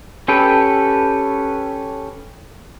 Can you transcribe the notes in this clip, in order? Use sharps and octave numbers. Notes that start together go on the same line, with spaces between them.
C#4 G4 A4 B4 G5